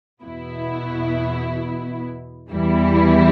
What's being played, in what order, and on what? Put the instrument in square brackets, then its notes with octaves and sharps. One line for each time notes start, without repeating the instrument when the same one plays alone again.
[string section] E2 B2 B3 E4
E2 E3 G3 E4